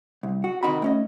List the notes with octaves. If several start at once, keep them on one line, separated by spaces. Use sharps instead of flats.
C2
F#4
C3 D#3 D#4 F#4 B5
A3 C#4 D#5